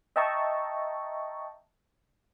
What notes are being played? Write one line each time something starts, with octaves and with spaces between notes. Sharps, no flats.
D#5 E5 G5 A5 A#5 C#6